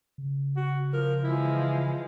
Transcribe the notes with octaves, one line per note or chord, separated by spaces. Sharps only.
C#3
F#4
F3 A#4
E3 F3 G#3 E4